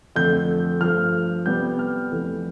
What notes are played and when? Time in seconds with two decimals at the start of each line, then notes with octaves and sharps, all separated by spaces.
0.16 F2 D3 A3 G6
0.81 G2 F3 A3 F6
1.45 C3 G3 B3 G6
1.79 F6
2.11 F2 E3 A3